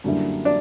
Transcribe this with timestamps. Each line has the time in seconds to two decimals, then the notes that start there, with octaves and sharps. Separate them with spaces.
0.04 F#2 D3 G3 A#3 E4
0.45 D4